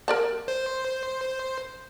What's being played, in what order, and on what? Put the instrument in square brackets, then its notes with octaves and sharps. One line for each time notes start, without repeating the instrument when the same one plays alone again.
[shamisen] A#4 D5 A5
[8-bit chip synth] C5